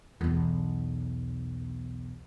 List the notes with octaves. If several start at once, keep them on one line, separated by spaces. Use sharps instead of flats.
B1 E2